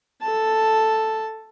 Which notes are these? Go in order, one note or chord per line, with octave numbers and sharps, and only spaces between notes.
A4 A5